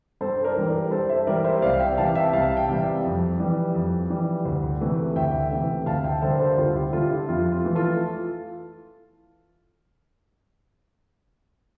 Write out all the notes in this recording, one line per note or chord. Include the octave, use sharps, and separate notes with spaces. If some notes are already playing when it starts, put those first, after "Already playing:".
G2 A4 C5
A#4 D5
E3 G3
A#4 D5
G2 A4 C5
C5 E5
E3 G3 A#4 D5
C5 E5
C2 D5 F5
F5
E5 G5
C3 E3 G3 F5 A5
E5 G5
C2 F5 A5
E5 G5
C3 E3 G3
F2
E3 G3
F2
E3 G3
D2
C3 E3 A3
D2 E5 G5
C3 E3 A3
D2 F5 A5
E5 G5
D3 G3 A4 C5
A#4
A4 C5
D2 F4
E4 G4
D3 G3 F4 A4
E4 G4
F2 F4
F4
E3 A3
F4 A4